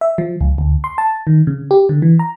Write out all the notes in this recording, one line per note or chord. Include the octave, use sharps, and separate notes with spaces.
E5
F3
C#2
D2
C6
A5
D#3
C#3
G4
D3
E3
A#5